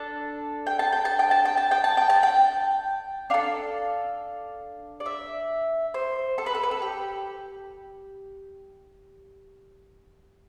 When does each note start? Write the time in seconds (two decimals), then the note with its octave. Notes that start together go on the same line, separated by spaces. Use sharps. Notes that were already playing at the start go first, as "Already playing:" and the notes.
Already playing: D4 A4 A5
0.67 G5
0.79 A5
0.92 G5
1.05 A5
1.19 G5
1.31 A5
1.45 G5
1.57 A5
1.71 G5
1.84 A5
1.97 G5
2.10 A5
2.23 G5
3.30 D4 A4 F5
5.00 D5
5.06 E5
5.94 C5
6.38 A4
6.46 B4
6.55 A4
6.63 B4
6.71 A4
6.82 G4